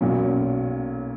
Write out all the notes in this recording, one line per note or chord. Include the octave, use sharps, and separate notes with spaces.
B1 A#2 F#3 C#4